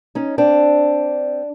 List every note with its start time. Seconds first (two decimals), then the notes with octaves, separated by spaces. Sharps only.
0.15 C#4 D#4
0.38 C4 D4